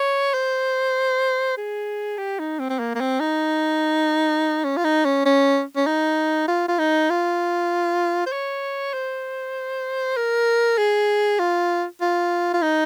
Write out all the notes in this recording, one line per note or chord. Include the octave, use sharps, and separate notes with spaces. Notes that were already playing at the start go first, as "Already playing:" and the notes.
Already playing: C#5
C5
G#4
G4
D#4
C4
C4
A#3
A#3
C4
D#4
C#4
F4
D#4
C#4
C#4
C#4
D#4
F4
F4
D#4
F4
C5
C#5
C5
A#4
G#4
F4
F4
F4
D#4